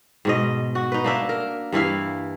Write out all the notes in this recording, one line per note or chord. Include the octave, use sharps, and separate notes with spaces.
G#2 B2 D#5
F#4
D#4 B4
A#3 D4 E5
A#4
G2 E3 E4 F5